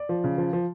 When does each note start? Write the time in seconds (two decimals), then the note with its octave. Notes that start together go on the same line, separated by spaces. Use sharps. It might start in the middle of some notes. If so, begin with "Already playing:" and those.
Already playing: D5
0.09 F3
0.24 C#3
0.38 F3
0.53 F3